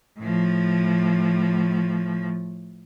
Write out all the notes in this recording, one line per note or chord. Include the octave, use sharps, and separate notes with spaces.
A2 F3